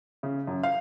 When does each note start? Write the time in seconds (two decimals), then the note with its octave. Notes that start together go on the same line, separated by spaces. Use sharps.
0.23 C#3
0.47 F#2
0.63 F5